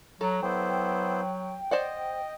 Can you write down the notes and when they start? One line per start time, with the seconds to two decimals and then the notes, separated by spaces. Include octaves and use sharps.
0.21 F#3 A4 A#5
0.43 F#3 B3 E4 C5 G5
1.71 C5 D5 D#5 F#5